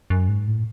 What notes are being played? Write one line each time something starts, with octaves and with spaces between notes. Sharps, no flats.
F#2
G#2
A2